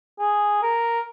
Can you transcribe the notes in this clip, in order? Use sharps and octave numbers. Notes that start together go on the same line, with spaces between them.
G#4
A#4